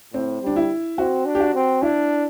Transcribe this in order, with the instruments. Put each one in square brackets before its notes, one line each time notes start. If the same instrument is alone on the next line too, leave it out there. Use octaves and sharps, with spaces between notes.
[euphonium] A2 [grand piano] C4
[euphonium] G3 [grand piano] D4
[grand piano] E4
[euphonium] C4 [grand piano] F#4
[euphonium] D4
[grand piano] G4
F#4
[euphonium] C4
[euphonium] D4 [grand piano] E4